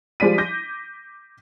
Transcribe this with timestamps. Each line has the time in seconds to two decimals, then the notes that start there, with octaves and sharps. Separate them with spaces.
0.20 F3 G3 G#3 D5 B6 D#7
0.38 D6 G6 A#6